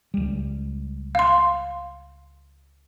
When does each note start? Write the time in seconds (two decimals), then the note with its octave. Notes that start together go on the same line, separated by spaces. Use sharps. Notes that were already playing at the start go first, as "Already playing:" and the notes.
0.14 C#2 G3
1.15 F5 C6